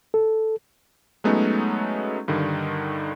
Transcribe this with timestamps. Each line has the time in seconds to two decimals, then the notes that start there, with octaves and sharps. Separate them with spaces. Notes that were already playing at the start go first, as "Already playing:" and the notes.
0.14 A4
1.24 F#3 G#3 A3 B3 C#4 D#4
2.28 G2 D3 D#3